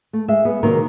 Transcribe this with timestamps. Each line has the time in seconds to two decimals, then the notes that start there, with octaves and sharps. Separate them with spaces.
0.13 A3
0.28 G#3 E5
0.45 B3 G#4
0.63 C3 D#3 F#3 A#3 A#4